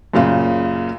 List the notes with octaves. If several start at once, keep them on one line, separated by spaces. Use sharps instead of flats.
F#2 A#2 C#3 F4